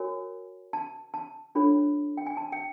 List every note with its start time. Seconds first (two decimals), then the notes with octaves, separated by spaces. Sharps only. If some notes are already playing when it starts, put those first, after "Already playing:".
Already playing: F#4 A#4 C#5 G#5
0.73 A5
1.14 A5
1.55 D4 F4 A4 C#5 B5
2.17 G5
2.27 G#5
2.37 A5
2.52 G5